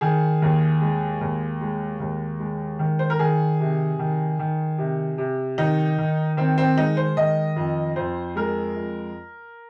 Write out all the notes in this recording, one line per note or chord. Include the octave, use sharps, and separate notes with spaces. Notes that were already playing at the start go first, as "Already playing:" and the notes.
D#3 G#4
D#2
G#3
D#2
G#3
D#2
G#3
D#3
C5
A#4
D#3 G#4
C3
D#3
D#3
C3
C3
D#3 D#4
D#3
D#3 C4
C4
G#3 D#4
C5
D#3 D#5
F2
F2 C5
G#3 A#4
F2